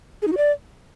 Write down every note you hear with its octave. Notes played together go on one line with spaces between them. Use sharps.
G#4
D#4
F#4
D5